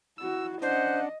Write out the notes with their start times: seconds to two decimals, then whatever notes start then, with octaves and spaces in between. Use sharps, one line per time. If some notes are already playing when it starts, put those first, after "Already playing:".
0.18 E4 F#4 E6
0.62 C#4 D4 C5 D#5 F#5 F#6